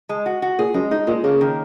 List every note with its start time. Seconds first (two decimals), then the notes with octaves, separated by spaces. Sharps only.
0.09 G#3
0.26 F#4
0.42 F#4
0.58 A#2 G#4
0.74 F#2 G#3
0.91 G#2 D#4
1.07 A#2 G#3
1.24 C#3 A#3
1.41 D#3